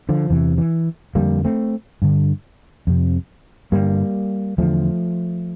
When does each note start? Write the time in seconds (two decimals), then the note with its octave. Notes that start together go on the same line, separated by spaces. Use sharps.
0.09 D3 F3
0.29 E2 C3 E3
0.58 E3
1.15 F2 D3 G3 A#3
1.44 A3 C4
2.02 G2 D3
2.87 F2 C3
3.72 G2 D3 G3 A#3
4.58 E2 D3 F3 A3